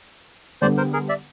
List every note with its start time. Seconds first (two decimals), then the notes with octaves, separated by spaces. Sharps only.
0.62 D3 G3 B3 C5 D5
0.77 A#4 C5
0.93 G#4 A#4
1.09 D5 E5